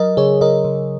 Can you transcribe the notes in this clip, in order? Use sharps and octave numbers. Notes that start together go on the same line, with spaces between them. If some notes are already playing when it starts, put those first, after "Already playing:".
Already playing: F#3 A#4 D#5
C#3 G#4 C#5
C#3 A#4 D#5
C#3